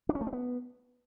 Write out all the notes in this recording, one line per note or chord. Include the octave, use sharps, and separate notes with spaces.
D4
C#4
A3
C4
B3